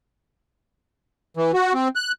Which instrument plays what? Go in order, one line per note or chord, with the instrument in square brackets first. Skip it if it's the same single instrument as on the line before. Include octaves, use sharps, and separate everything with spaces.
[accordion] E3
F#4
C4
F#6